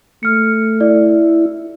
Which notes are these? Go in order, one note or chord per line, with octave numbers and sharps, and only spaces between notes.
A3 F6 C#7
E4 D5